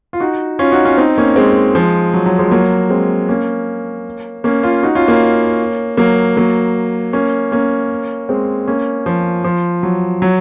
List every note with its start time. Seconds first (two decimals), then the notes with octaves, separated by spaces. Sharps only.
0.13 F4
0.20 D#4 F#4
0.59 C#4 F4
0.72 D#4 F#4
0.85 C#4 F4
0.97 C4 D#4
1.18 A#3 C#4
1.36 G#3 C4
1.75 F3 G#3
2.14 F#3
2.26 F#3
2.39 F3 G#3
2.51 F#3 A#3
2.90 G#3 C4
3.29 A#3 C#4
4.44 A#3 C#4
4.63 C#4 F4
4.83 D#4 F#4
4.95 C#4 F4
5.08 A#3 C#4
5.97 F#3 A#3
6.37 F#3 A#3
7.13 A#3 C#4
7.52 A#3 C#4
8.29 G#3 C4
8.67 A#3 C#4
9.06 F3
9.44 F3
9.83 F#3
10.22 F#3